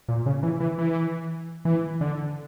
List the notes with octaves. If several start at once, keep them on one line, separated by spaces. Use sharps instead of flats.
A#2
C#3
E3
E3
E3
E3
D3